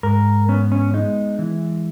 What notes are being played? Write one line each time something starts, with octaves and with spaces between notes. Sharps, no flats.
G#2 A#4
B3 C#4
C#4
G#3 D#4
E3